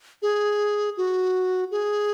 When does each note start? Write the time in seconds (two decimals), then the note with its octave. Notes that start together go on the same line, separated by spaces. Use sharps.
0.22 G#4
0.97 F#4
1.71 G#4